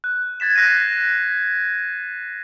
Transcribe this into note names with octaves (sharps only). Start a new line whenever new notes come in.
F#6
G#6 A6 B6 E7
F#6 A#6 C7 D#7